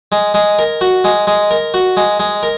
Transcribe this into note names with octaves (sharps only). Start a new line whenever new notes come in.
G#3
G#3
A#4
F#4
G#3
G#3
A#4
F#4
G#3
G#3
A#4